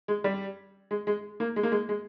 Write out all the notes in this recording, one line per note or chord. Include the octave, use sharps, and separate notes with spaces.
G#3
G3
G#3
G#3
A#3
G#3
A#3
G#3
G#3